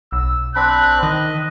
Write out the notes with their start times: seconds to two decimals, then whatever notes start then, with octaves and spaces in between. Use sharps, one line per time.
0.12 B1 E6
0.56 C4 D4 B5 F#6
1.03 D#3 D#5